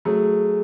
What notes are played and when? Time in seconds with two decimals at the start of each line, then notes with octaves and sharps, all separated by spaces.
0.05 F#3 A3 G#4